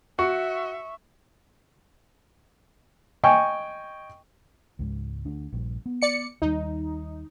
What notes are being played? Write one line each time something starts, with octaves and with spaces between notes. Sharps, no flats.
F#4 E5 C#6
D#5 G5 G#5 C#6
C#2 G#2
D2 D4
A#1 G2
B3
D5 C#7
D#2 G3 D#4